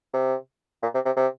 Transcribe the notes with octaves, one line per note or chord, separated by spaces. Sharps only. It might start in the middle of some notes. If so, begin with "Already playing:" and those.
C3
A#2
C3
C3
C3